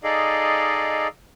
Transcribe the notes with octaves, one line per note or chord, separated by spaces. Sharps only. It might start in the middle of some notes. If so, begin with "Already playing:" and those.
D#4 G#4 A4 D5 D#5 F5